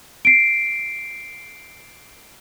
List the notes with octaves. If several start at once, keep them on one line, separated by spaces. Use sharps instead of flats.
C7 D7